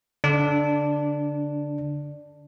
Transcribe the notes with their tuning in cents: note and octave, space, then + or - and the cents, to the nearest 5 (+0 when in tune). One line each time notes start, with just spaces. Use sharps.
D3 -30 D4 +5